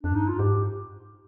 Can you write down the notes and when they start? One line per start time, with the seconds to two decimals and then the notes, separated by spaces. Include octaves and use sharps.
0.03 F2 D4
0.12 G2 D#4
0.28 F4
0.39 G#2 G4